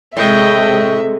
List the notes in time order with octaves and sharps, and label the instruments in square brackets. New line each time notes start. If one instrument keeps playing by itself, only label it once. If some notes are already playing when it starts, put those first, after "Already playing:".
[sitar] A2 [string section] C3 G#3 [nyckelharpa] D#5 G5 [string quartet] E5